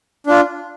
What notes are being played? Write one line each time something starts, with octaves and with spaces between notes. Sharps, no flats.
D4 F4